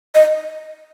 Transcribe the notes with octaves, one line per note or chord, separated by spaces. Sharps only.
D#5